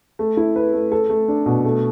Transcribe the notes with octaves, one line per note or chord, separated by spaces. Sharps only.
A3
E4
B4
A3
A4
A3
D4
B2
A3